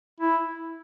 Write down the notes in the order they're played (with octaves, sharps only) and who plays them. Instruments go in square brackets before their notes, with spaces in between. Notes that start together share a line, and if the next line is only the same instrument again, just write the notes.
[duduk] E4